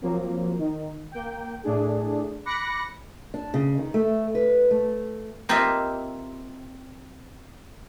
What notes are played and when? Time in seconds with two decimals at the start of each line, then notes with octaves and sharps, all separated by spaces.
0.02 F3 F#3 A#3 C4
0.58 D#3
1.12 A#3 G5
1.64 A2 A3 D4 G#4
2.45 B5 D6 F#6 A#6 C#7
3.34 D4
3.54 C#3
3.78 D#3
3.94 A3
4.35 B4
4.71 A3
5.49 A#3 C4 F4 G4 D#5 E5